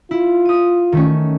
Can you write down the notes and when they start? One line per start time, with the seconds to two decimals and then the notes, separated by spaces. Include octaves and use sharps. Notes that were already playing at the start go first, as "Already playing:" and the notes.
0.11 E4 F4
0.45 D#6 D#7
0.92 D#3 A3 C#4